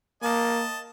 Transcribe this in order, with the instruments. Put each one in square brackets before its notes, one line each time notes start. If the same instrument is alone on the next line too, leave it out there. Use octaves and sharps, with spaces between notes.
[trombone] A#3 [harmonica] D#5 A5